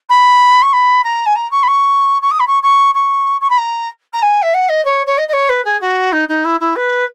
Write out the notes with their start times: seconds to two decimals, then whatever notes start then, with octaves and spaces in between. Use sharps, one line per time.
0.09 B5
0.62 C#6
0.73 B5
1.04 A#5
1.26 G#5
1.35 A#5
1.51 C#6
1.63 B5
1.67 C#6
2.22 C#6
2.31 D#6
2.39 B5
2.47 C#6
2.63 C#6
2.94 C#6
3.41 C#6
3.50 B5
3.57 A#5
4.13 A#5
4.22 G#5
4.42 E5
4.54 F#5
4.69 D#5
4.85 C#5
5.06 C#5
5.18 D#5
5.28 D#5
5.33 C#5
5.49 B4
5.64 G#4
5.81 F#4
6.12 D#4
6.28 D#4
6.44 E4
6.60 E4
6.76 B4